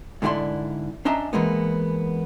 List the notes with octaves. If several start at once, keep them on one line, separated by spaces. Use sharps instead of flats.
G#2 D3 E4 G4 D5 C6
C#4 D4 D#5 E5 A#5
E3 G#3 A#3 B3